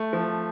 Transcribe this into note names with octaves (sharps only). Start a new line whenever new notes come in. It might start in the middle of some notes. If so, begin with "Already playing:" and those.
Already playing: A3
F3